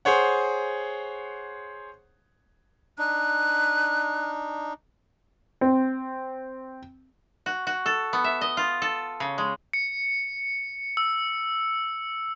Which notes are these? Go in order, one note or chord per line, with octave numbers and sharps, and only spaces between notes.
G#4 C5 C#5 F#5
D4 D#4 F#6
C4
F#4
F#4
A4
B3
E5
D#5
F4
A4
C#3
G#3
C#7
E6